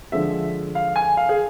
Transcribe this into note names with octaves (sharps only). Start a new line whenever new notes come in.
D3 F3 G#3 E5
F5
G#5
F5
G#4